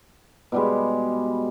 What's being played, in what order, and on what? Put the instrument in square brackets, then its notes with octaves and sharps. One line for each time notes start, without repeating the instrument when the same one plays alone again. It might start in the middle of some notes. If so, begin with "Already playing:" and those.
[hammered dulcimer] B2 G3 G#3